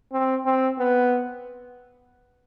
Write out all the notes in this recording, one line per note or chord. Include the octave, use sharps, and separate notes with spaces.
C4
C4
B3